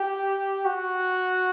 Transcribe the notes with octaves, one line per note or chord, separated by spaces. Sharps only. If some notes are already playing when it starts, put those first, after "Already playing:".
Already playing: G4
F#4